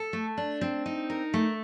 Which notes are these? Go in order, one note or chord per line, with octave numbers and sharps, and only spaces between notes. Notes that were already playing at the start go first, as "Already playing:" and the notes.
Already playing: A4
A3
D4
C4
D#4
A#4
A3